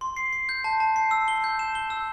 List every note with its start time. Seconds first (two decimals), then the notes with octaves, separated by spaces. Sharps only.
0.01 C6
0.17 C7
0.33 C7
0.49 G6
0.64 A5
0.80 A5
0.96 C7
1.11 E6
1.28 G7
1.44 G6
1.59 E7
1.75 G7
1.90 E6